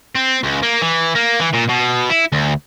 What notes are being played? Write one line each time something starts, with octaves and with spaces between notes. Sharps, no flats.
C4
C#2
A#3
E3
A#3
E3
A#2
B2
E4
D2